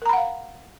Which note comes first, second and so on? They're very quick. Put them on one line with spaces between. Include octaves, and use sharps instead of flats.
A#4 A#5 B5 F#5 F5